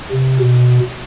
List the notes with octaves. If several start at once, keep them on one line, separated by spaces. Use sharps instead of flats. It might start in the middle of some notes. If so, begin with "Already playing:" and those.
C3
B2